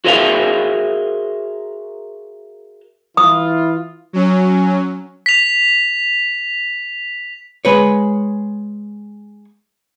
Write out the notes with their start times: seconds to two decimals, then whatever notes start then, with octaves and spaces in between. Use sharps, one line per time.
0.05 F#4 G#4 A#4 C5 E5 F5
3.17 E3 E4 F4 D#6
4.13 F#3 C#4
5.26 B6 F7
7.65 G#3 B4 C#5